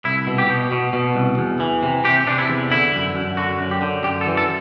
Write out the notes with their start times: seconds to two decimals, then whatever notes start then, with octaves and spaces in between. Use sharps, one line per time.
0.05 C2 E4
0.27 B2
0.38 G4
0.48 B2
0.72 B2
0.93 B2
1.15 C2
1.38 E2
1.60 E3
1.83 C3
2.04 C3 G4
2.27 C3 D4
2.38 E4
2.49 E2
2.70 D3 E4
2.94 F#2
3.15 F#2
3.37 D3 F#4
3.60 F#2
3.71 G4
3.82 D3
4.04 F#2 G4
4.21 A4
4.27 E3
4.37 A4